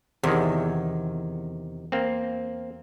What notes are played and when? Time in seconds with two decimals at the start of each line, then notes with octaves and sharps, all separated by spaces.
0.23 E2 C3 D#3
1.92 A#3 C4